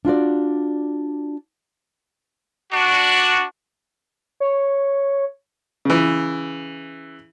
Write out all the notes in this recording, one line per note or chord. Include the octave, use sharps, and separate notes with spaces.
D4 F4 F#4 D5
D4 F#4
C#5
C#3 E3